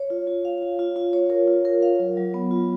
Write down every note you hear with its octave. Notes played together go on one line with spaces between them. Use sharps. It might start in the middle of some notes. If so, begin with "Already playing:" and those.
Already playing: C#5
F4
F4
F5
F4
F4
F4
C#5
A#4
F4
A#4
F5
F#3
F#3
B3
F4